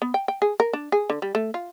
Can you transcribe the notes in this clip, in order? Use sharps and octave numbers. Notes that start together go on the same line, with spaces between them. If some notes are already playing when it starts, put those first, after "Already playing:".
B3
G5
G5
G#4
A#4
D4
G#4
D3
G3
A3
F4